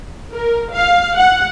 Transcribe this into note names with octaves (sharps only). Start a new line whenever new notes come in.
A#4
F5
F#5